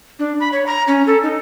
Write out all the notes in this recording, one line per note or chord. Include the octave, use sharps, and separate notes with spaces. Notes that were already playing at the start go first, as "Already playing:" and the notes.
D4
B5
C#5
A#5
C#4
A4
D#4